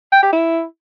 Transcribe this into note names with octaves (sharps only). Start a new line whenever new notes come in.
G5
G4
E4